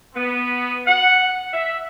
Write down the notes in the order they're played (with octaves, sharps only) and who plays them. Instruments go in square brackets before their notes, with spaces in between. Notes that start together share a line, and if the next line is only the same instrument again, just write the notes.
[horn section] B3
F#5
E5